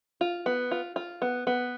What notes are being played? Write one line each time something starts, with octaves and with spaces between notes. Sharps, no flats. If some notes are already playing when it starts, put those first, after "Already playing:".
F4
B3
F4
F4
B3
B3